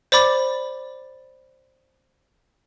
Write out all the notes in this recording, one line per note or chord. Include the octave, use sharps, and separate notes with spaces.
C5 D5 B5 D6 A6